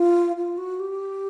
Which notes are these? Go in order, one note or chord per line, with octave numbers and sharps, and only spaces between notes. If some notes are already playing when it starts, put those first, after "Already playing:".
Already playing: F4
F4
F#4
G4